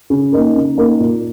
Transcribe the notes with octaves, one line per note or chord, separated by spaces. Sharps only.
C#3
A#3 D#4 A#4
C#3
A#3 D#4 A#4
A#2